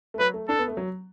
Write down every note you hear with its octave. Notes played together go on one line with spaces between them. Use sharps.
A3
F#3 B4
A3
D4 A4
B3
A3
F#3